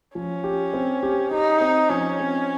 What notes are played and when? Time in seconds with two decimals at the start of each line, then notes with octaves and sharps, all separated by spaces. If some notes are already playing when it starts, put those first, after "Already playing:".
0.15 F3 C#4
0.44 G4
0.74 C4
1.03 G4
1.31 D#4 G4
1.61 C4
1.90 F3 C#4
2.20 C4